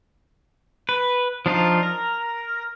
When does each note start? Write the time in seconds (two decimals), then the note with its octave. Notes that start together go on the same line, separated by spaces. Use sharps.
0.89 B4
1.46 F3 D4 D#4 F4
1.83 A#4